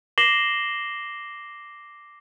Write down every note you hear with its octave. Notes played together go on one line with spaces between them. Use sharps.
D6 A#6 C7 E7 F#7 G7